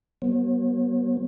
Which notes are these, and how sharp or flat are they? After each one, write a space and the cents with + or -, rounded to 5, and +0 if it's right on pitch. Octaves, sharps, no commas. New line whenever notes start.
F#3 +45 B3 -35 C#5 -40